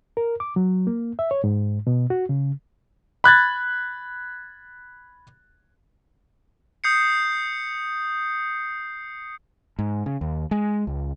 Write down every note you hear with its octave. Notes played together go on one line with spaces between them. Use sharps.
A#4
D6
F#3
A#3
E5
C#5
G#2
B2
F#4
C#3
B5 F#6 G#6 A6
D#6 G6 C7 C#7
G#2
C#3
D#2
G#3
C#2